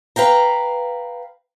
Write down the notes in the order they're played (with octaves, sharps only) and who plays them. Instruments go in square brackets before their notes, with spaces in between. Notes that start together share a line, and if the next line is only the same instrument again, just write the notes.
[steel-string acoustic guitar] B4 F5 G5 A#5